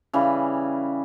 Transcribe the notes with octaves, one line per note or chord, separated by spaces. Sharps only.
C#3 E3 G3